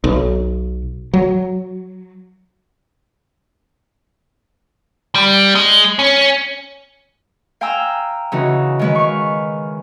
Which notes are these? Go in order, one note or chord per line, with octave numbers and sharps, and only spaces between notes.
B1
F#3
G3
G#3
C#4
F5 G5 G#5 A#5 E6
C#3 E3 D#4 F#4
D#3 G#3 B4
F5 C#6